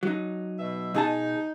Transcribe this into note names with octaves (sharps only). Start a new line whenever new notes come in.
F#3 D#4
B2 E5
B2 D#4 G#4 A5